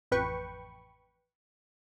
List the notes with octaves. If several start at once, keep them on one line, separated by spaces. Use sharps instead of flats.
A1 F2 B4 G5 C#6